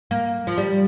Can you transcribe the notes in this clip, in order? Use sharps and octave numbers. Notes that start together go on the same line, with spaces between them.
A#3
F3
G3